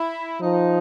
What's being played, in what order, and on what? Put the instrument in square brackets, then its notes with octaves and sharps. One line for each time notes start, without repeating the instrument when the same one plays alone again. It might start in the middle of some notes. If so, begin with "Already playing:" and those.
Already playing: [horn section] E4
[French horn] F3 [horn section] D#4